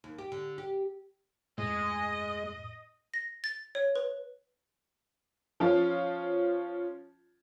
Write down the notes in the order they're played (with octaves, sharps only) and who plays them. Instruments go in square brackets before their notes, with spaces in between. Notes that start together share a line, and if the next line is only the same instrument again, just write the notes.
[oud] D#2
G4
D3
G4
[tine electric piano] F2 A2 [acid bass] G#3 [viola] D#5
[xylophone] A#6
A6
C#5
B4
[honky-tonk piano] F3 C#4 F4